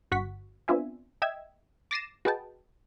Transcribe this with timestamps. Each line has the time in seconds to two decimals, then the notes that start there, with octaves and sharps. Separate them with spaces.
0.11 G1 F#4 F#5 C#6 B6
0.68 B3 C4 D4 F4 E5 G#5
1.22 D#5 E5 G5 E6 G#6
1.91 D6 A6 A#6 C7 D#7 E7
2.25 F#4 G#4 B4 D#5 G5 A5